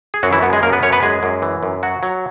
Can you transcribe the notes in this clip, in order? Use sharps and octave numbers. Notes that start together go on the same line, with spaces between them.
G#4
F#2 F#3 F#4
E3 E4
F#2 B3
G#3 G#4
F#2 A#3 A#4
B3 B4
F#2 C#4 C#5
B3 B4
F#2 G#3 G#4
F#2
E3
F#2
F#3 F#4
F#3